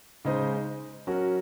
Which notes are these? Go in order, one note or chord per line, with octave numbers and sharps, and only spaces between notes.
C#3 G#3 D#4 G#4 C5
F#3 C#4 F#4 A#4